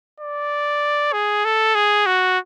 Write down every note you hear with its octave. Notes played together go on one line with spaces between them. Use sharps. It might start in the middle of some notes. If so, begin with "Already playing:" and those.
D5
G#4
A4
G#4
F#4